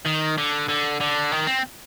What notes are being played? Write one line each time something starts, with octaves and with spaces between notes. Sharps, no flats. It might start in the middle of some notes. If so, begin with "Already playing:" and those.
D#3
D3
D3
D3
D#3
C4